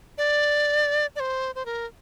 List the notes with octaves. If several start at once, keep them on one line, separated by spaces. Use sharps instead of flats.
D5
D5
C5
C5
A#4